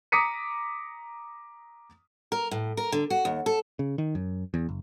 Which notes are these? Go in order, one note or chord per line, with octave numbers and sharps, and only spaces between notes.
A#5 D6 D#6 B6 C#7 D#7
A#4
A2
A#4
D3
F#4
D#2
A4
C#3
D#3
F#2
E2
F#1